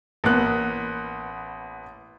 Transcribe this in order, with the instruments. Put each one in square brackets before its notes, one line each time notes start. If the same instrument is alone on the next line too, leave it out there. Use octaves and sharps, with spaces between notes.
[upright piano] A1 A#3 B3 F#6